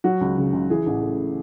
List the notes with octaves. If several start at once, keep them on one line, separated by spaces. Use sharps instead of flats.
F#3 F#4
C#2
C#3
C#2
E3 G#4
A1
A2